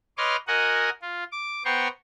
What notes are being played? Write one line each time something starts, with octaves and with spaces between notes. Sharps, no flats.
B4 C#5 D#5 C6 D6 F6
F#4 A#4 D#5 F#5 G#5
F4
D6
B3 C5 G5 A#5 C6 C#6